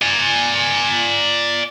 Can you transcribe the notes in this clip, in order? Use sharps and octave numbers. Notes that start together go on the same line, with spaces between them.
D5 G#5